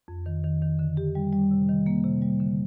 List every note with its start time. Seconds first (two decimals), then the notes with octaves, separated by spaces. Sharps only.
0.08 F2
0.26 D#3
0.44 D#3
0.62 D#3
0.79 D3
0.97 G4
1.15 G3
1.33 G3
1.51 C3
1.69 D#3
1.86 A#3
2.04 C3
2.22 G3
2.40 D3